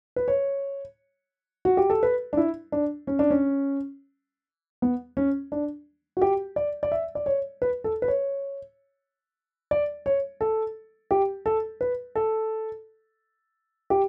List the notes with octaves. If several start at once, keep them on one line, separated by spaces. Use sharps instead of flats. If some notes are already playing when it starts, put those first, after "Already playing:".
B4
C#5
F#4
G4
A4
B4
D4
E4
D4
C#4
D4
C#4
B3
C#4
D4
F#4
G4
D5
D5
E5
D5
C#5
B4
A4
B4
C#5
D5
C#5
A4
G4
A4
B4
A4
G4